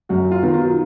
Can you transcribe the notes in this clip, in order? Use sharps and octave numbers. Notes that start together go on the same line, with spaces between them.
F#2 F#4
F4
D#3 F#3 B3
F4